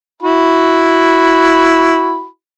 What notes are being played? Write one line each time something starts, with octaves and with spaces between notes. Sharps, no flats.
E4 F#4 B5